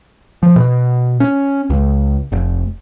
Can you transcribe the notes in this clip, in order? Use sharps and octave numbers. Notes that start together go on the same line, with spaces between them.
F3
B2
C#4
C#2
F1